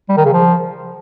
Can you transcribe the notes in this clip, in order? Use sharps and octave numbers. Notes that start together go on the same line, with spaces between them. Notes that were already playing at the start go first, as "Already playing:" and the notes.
G3
D#3
C#3
F3